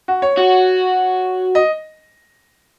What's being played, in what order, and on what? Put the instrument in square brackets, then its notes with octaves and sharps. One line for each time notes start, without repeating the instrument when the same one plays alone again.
[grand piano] F#4
C#5
[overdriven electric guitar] F#4
[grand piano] D#5